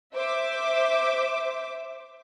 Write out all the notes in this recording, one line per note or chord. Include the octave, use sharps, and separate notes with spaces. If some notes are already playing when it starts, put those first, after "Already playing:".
C5 E5 D6